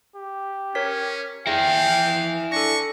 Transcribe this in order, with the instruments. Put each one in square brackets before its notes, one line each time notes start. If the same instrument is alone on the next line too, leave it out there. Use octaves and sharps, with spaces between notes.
[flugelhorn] G4
[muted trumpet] C#4 [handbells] A#4 C#5 B6
[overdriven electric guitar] E4 G#4 [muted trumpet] F5 [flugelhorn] G5 [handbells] A#6
[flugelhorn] D4 [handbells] A4 A#6 [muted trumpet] C#6